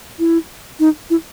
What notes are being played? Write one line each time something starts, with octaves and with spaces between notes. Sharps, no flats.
E4
D#4
E4